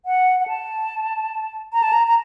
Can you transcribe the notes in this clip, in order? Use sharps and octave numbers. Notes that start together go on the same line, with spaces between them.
F#5
F#5
A5
A#5
A5
A#5
A#5